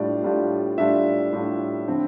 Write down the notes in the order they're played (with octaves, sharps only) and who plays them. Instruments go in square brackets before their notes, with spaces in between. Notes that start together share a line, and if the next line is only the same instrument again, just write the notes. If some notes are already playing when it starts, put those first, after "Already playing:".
Already playing: [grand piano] A2 G3 D4 F4 D5
A2 G3 D4 F4
A2 G3 D4 F4 E5
A2 G3 D4 F4
D3 F3 C4